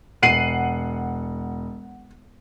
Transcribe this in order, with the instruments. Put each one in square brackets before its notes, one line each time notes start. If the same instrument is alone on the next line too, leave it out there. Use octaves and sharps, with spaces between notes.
[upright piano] E1 D#7 F#7 [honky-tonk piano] F#5 C7